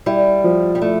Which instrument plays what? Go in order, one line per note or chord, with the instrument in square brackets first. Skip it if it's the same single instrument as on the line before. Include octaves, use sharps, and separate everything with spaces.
[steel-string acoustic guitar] G3 [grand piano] E4
[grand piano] F3
[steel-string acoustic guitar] G3
[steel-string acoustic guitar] A3 [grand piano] E4